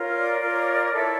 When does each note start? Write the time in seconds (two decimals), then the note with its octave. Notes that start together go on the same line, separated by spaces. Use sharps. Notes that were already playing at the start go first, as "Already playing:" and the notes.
Already playing: F4 A#4 C#5
0.16 D5
0.42 F4 A#4 C#5
0.94 E4 A4 C#5